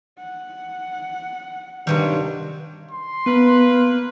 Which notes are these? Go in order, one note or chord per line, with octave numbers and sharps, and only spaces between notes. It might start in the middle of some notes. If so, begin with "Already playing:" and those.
F#5
G2 C3 D#3 F#3 G3
C6
A#3 B3 F4 B4